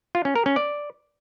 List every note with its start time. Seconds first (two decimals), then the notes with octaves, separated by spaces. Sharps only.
0.15 F4
0.25 C#4
0.35 A#4
0.46 C#4
0.56 D5